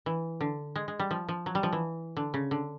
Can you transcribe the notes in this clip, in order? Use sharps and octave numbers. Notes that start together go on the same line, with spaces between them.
E3
D3
G#3
G#3
G3
F3
F3
F#3
G3
F3
E3
D3
C#3
D3